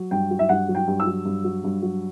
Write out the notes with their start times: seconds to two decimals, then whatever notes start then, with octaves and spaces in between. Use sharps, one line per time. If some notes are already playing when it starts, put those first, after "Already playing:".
Already playing: F#3
0.11 G2 G5
0.31 F#3
0.39 E5
0.49 G2 F#5
0.69 F#3
0.75 G5
0.87 G2
1.00 E6
1.07 F#3
1.25 G2
1.44 F#3
1.64 G2
1.82 F#3